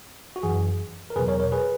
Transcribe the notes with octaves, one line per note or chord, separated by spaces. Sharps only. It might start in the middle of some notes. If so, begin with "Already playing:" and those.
F#4
F#2 E3 G#4
A#4
E2 B2 F#3 G#4 B4
A#4 C#5
A#4 C#5
G#4 B4